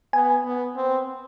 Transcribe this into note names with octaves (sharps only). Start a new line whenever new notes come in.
B3 G#5
B3
C4